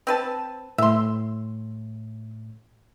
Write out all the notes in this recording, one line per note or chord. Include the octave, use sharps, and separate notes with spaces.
C4 B4 A5
A2 E5 C6